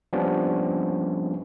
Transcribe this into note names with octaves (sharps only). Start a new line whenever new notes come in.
F3 G3 A#3 B3 C#4 D4